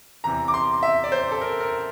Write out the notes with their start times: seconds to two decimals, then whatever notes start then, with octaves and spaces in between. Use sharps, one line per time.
0.24 E2 C3 E3 A#5
0.48 D6
0.54 C6
0.83 E5
1.04 D5
1.12 C5
1.31 A4
1.41 A#4
1.60 A#4